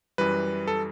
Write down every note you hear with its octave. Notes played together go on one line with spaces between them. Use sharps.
F#2 E3 G3 B4
A4